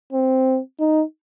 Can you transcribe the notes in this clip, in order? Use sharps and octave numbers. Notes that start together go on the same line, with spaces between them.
C4
D#4